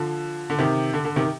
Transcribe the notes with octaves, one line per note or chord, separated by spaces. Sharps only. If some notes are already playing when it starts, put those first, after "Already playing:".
Already playing: D3 F3
D3
C3 D#3
D3
D3
C3 D#3